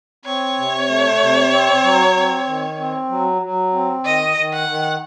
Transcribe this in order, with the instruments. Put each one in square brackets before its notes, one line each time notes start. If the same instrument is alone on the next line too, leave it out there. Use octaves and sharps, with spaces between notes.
[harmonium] C4 [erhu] C#5
[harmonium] C3
A3
C3
C4
F#3
C4
D#3
C4
F#3
F#3
C4
[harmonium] D#3 [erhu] D#5
[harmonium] D#3
[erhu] F#5
[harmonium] D#3